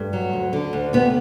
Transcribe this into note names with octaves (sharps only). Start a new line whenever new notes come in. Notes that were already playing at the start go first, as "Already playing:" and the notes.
Already playing: G2 A3
F#3
D2
D3
D2
C3 B3